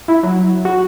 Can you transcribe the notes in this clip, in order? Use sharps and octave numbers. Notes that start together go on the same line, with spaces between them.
E4
F#3
F#4